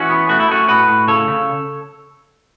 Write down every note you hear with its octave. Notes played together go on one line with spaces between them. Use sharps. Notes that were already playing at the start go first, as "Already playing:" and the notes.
Already playing: E3 C#4 F#4
B3
A3 F#4
E4
A3 C#4 F#4
A2 F#4 B4
A2
C#3 A4 C#5
C#3